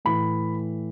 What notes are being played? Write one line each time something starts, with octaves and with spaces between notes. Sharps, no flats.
A2 E3 B5